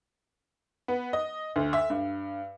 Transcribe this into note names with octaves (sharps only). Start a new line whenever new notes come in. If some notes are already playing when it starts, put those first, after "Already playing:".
B3
D#5
D2
E5
G2